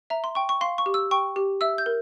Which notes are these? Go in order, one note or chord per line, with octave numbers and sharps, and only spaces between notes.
E5 A#5
C6
G5 C#6
C#6
F5 C6
C#6
G4
E6
G5 C#6
G4
E5 E6
G6
A#4